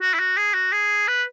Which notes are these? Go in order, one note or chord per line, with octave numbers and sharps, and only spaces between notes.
F#4
E4
F#4
G#4
F#4
G#4
B4